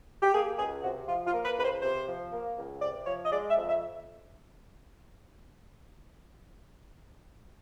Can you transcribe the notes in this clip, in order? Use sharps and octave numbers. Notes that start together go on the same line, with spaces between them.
G4
A#3 G#4
C#2 G#4
C3 F#4
F3 F4
F4
A#3
B4
C#2 B4
C5
C3 C5
F3
A#3
C#2
C3 D5
F3 C#5
D#5
G#3 D5
E5
F2
E5